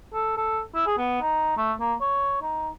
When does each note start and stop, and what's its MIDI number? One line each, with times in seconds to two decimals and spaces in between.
0.13 0.33 69
0.37 0.61 69
0.75 0.82 64
0.87 0.95 68
0.98 1.17 59
1.21 1.56 63
1.57 1.73 57
1.80 1.94 58
2.01 2.41 73
2.42 2.69 63